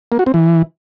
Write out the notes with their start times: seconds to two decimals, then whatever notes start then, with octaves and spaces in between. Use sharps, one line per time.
0.12 A#3
0.19 F#4
0.26 C4
0.34 E3